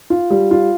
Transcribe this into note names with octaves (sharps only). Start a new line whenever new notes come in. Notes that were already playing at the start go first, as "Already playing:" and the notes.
F4
G3
F4